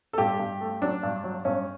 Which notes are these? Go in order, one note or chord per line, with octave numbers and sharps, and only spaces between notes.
A4
G2 G4
G2
A3
F#3 D4
G2
F#3
G2 C#4